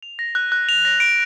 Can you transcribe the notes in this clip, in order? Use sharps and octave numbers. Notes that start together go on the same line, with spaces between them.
F7
A#6
F#6
F#6
F7
A#6
D7